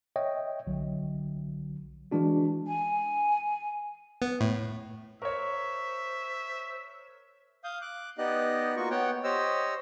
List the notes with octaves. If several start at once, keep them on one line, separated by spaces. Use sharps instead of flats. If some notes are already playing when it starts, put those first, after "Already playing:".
C#5 D#5 E5 G5
B1 D3 F#3
E3 G#3 D4 F#4
G#5
B3
A2
A#4 C5 C#5 E5 C#6
F5 D#6 G6
D6 F#6
B3 D#4 G4 D5 D#5 F#6
A#3 F4 F#4 C#6
B3 C#5 F#5 G5
G4 C5 C#5 D#5 E6